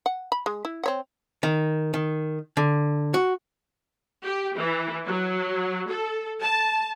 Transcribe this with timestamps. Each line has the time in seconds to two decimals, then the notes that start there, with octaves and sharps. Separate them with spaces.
0.06 F#5
0.32 B5
0.46 G#3
0.65 E4
0.83 C4 C#5 F#5
1.43 D#3
1.94 D#3
2.57 D3
3.14 F#4
4.23 G4
4.56 E3
5.05 F#3
5.88 A4
6.40 A5